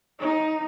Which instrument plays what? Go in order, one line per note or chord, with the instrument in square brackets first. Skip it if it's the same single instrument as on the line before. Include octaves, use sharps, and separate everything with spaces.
[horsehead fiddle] D#4